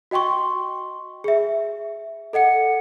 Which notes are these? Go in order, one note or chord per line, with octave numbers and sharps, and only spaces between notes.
F#4 D#5 G5 C6 C#6
G#4 E5
A4 D#5 F#5 C#7